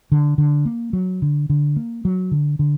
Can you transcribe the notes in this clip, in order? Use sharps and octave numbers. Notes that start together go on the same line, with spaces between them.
D3
D3
A#3
F#3
D3
D3
A#3
F#3
D3
D3